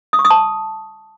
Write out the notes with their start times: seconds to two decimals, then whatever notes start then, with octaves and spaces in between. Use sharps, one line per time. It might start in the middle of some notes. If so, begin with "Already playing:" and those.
0.13 D#6
0.19 C#6
0.25 D#6
0.30 A5